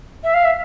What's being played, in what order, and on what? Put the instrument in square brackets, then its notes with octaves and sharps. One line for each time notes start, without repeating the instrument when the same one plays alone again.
[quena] E5
F5
E5